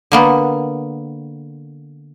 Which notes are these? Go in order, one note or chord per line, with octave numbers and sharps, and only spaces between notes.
D3 A#3 B3